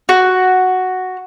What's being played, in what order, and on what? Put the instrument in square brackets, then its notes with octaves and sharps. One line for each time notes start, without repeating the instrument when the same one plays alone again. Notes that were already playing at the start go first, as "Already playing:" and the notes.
[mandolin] F#4